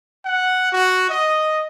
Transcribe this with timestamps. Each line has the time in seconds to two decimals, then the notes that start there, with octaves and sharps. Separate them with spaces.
0.25 F#5
0.72 F#4
1.09 D#5